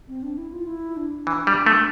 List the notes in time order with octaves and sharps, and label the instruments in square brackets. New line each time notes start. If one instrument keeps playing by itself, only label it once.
[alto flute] C4
D4
E4
F4
E4
D4
[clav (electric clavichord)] E3
G3
A3